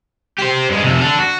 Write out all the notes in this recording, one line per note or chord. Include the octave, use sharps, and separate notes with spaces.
G4 C5
G2 G#3
F2 C3
D4 A4
F#4